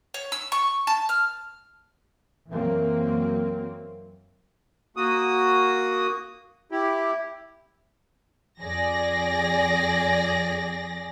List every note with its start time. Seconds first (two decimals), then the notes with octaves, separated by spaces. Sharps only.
0.14 C#5
0.32 E6
0.52 C#6
0.87 A5
1.09 F6
2.50 F#2 E3 F#3 A#3 C4
4.96 A#3 F#4 D#6
6.72 E4 G4
8.61 F2 G#4 D5 A#6